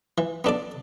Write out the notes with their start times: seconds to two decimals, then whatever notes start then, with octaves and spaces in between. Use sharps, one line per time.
0.18 E3
0.44 B3 D4 A4 D5